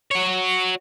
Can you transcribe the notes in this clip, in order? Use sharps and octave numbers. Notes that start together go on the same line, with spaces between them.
F#4 C#5